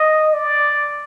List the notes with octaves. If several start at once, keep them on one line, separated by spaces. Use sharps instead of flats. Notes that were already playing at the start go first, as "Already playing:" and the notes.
Already playing: D#5
D5